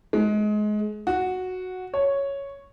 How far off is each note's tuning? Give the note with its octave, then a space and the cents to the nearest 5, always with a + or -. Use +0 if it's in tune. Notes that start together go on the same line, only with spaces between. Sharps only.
G#3 +25
F#4 -5
C#5 +0